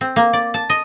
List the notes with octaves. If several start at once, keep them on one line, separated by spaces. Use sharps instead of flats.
C4
A#3
D5
A5
D#5